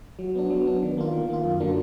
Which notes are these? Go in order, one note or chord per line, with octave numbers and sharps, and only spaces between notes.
F#3
B3 D4
F#3
B3 D4
D#3
A#3 F4
D#3
A#3 F4
F#2
D3 F#3 A#3 D4